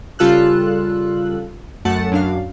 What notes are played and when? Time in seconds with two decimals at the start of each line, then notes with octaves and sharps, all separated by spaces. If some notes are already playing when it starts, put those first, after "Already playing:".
0.19 C#3 G3 F4 A4 E6 F#6
1.85 F#2 A3 F#5 A5 C#7
2.12 F#2 D4 F5